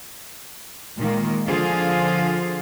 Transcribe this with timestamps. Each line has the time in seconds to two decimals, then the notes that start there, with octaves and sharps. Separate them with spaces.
0.98 A#2 D#3 G#3 A#3
1.48 D3 F3 F4 G#4 C5 F5